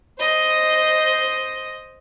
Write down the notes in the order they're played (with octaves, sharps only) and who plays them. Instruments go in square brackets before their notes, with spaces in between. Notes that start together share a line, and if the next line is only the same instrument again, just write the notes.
[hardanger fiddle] C5 D#5